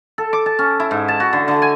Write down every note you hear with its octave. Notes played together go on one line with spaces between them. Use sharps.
A4
D6
A5
C#4
E4
G#2
A5
F#4
D3
D3
G#5